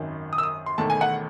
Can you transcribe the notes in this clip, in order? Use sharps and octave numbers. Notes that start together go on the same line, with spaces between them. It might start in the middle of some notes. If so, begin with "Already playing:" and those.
Already playing: G#1 F#2 D#3
D#6
E6
D#6
C6
E1 E2 D#3 A3 A5
G#5
F#5